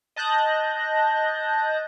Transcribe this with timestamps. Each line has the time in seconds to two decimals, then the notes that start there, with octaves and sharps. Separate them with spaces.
0.16 D#5 A5 F#6 G6 A#6